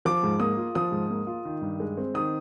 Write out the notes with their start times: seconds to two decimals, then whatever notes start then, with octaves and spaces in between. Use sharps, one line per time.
0.05 F3 D6
0.23 G#2
0.40 A#3 D#6
0.57 F4
0.75 F3 D#6
0.92 G#2
1.10 A#3
1.27 F4
1.45 D#3
1.62 G2
1.80 G#3
1.97 C4
2.14 D#3 D#6